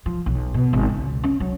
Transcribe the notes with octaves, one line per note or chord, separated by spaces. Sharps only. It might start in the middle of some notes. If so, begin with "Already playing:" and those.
F3
B1
B2
G#1
C#2
C#4
F#3